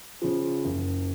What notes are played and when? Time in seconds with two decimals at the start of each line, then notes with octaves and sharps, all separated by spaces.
0.22 C#3 F3
0.65 F#1